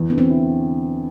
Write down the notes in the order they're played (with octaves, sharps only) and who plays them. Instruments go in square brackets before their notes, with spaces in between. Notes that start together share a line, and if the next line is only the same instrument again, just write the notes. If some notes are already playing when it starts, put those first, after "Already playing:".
Already playing: [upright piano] E2
[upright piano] D3 [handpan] B3
[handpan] C4
[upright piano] E4